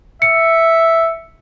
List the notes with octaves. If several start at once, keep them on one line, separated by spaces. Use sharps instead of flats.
E5 C#7